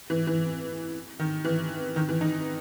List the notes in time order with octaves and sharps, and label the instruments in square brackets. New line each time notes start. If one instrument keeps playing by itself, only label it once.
[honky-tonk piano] E3
E3
D#3
E3
D#3
E3
D#4